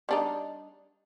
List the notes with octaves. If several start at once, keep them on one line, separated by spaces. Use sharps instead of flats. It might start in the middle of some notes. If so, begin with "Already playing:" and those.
G3 D4 D#4